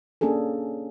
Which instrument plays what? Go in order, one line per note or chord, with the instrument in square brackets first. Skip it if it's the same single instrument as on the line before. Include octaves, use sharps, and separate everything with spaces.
[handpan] A#3 C#4 D4 G#4 A4